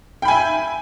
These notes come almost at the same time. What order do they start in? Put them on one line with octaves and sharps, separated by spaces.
G5 B5 G#5 E5